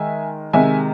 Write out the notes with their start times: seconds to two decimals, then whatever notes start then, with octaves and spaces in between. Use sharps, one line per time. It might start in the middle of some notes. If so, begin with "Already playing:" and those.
Already playing: D#3 G#3 E5 G#5
0.53 C3 D#3 G#3 E5 G#5